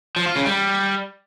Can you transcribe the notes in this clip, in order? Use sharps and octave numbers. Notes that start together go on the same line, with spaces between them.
F3
F4
C#3
G3